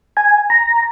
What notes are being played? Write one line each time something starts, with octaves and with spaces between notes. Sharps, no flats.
G#5
A#5